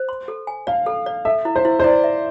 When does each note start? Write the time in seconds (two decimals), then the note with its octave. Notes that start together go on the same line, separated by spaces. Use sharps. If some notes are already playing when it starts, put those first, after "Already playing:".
Already playing: C5
0.09 C6
0.28 A4
0.47 G#5
0.67 D5 F5
0.86 A4
1.06 D5
1.25 A4 E5
1.45 E4
1.56 C5
1.65 E4
1.80 C5
1.84 E4 D5
2.04 E5